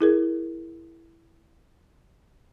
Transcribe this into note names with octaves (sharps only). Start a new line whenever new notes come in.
E4 G#4 A#4